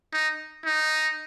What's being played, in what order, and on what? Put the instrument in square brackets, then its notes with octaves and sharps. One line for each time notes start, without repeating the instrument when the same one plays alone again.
[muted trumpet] D#4
D#4